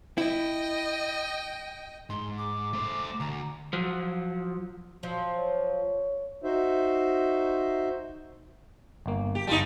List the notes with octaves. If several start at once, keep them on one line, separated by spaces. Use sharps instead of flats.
E4 D#5 G5
G#2 C6
D6
A3 C5
D2 A#5
F3 F#3
F3 F#3
C#5
D#4 F#4 C5 E5
G1 A#3
G4
G1 G3 D#4 F4 A5